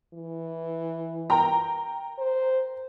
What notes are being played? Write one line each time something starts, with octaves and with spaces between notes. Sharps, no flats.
E3
A#4 G5 A#5
C5